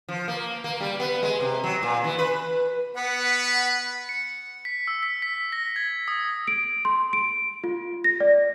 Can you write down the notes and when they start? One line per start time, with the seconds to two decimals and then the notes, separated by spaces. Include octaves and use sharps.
0.08 F3
0.28 A#3
0.64 A#3
0.81 G3
1.00 B3
1.23 G#3
1.40 C3
1.64 F#3
1.83 A#2
2.04 E3
2.18 B4
2.95 B3 B4 F#5
4.09 C#7
4.65 B6
4.88 E6
5.03 B6
5.22 B6
5.52 A#6
5.76 G#6
6.08 D#6
6.48 D7
6.85 C6
7.13 D7
7.64 F4
8.04 A#6
8.20 D5